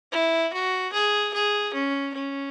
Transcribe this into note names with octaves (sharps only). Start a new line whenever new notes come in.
E4
F#4
G#4
G#4
C#4
C#4